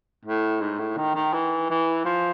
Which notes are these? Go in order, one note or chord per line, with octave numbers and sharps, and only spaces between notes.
A2
G#2
A2
D#3
D#3
E3
E3
F3